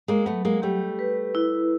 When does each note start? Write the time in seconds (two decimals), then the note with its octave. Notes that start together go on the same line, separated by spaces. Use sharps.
0.08 G#3 A#3
0.26 F#3 A3 B3
0.45 G#3 A#3
0.62 G3 A3 G4
0.99 B4
1.35 E4